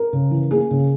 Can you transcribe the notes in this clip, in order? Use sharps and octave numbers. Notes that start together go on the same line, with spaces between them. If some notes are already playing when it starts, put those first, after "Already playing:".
Already playing: A#4
C#3
E3
A#3 G#4
C#3